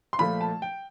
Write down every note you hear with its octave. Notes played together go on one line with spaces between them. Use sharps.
C6
A#2 F3 A3 B5
A5
G5